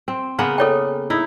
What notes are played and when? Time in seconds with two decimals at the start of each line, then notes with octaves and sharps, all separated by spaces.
0.08 C4
0.39 C#3 A#3 B3
0.58 A4 C#5 G5
1.10 D#4 E4